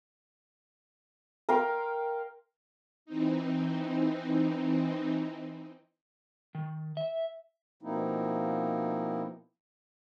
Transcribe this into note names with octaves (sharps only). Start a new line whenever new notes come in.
A#4 F5 G5 C6
E3 C4 D#4
D#3
E5
B2 F3 A#3 C4 D#4 E4